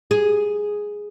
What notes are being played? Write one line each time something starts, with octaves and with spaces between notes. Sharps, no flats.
G#4